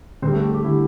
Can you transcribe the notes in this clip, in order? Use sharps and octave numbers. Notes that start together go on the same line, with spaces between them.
D2 D3 G3 C4 C5
A3 A4
G4
G4
D3 G3 E4